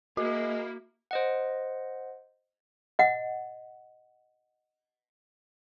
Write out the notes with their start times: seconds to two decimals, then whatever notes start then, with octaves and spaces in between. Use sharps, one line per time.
0.17 G#3 A#3 E4 F#4
1.11 C5 D#5 F#5
2.99 D#5 F#5